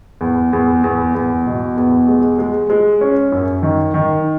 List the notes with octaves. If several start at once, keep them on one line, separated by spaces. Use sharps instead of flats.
E2
E2
E2
E2
B2
E2
G#3
G#3
G#3
C#4
F#2
D#3
D#3